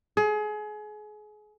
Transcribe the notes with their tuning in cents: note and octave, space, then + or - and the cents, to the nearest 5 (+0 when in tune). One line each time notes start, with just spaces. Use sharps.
G#4 +30